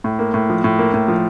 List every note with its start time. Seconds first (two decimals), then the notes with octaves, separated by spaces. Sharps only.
0.04 A2
0.19 A#3
0.34 A2
0.50 F3
0.64 A2
0.79 A#3
0.94 A2
1.08 F3